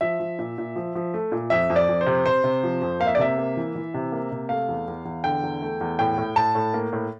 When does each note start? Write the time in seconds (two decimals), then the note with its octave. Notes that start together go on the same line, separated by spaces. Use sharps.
0.01 F3 E5
0.20 F3
0.39 A#2
0.58 A#2
0.76 F3
0.95 F3
1.14 A3
1.32 A#2
1.50 F2 E5
1.70 F2
1.76 D5
1.89 F2
2.01 C5
2.06 C3
2.26 C3 C5
2.44 C3
2.63 F3
2.82 F2
3.00 A#3 F5
3.07 E5
3.15 D5
3.18 C3 E5
3.38 A#3
3.57 E3
3.75 E3
3.94 C3
4.12 A#3
4.32 C3
4.49 A3 F5
4.68 E2
4.88 E2
5.05 E2
5.24 D3 G5
5.43 E2
5.62 A3
5.81 E2
5.99 A2 G5
6.18 A2
6.36 A2 A5
6.55 A2
6.74 A#3
6.93 A2